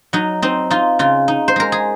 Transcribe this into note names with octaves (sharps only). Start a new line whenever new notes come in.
F#3 D#4
C4 D#4
D#4 F4
C#3 F4
D#4
C5
G#3 A#4
G#4